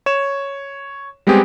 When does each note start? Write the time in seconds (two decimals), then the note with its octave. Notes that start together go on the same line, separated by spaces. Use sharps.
0.06 C#5 E7
1.27 G3 G#3 B3 C4 G4 G#4